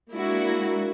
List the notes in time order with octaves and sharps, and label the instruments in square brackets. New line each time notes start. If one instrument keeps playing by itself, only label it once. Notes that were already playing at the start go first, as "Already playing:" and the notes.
[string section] G#3 A#3 D4 E4 F#4 A#4